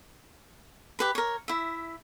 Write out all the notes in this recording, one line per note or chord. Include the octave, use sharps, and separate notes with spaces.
G4 B4 B5
A#4 C#5
E4 E5